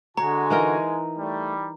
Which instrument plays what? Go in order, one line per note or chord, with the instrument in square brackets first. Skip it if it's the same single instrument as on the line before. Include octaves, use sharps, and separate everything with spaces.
[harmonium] D3 F#4 [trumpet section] G#3 G#5 [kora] C#5 [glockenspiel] A#5
[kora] E3 D#4 A#4
[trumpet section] G3 [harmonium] A3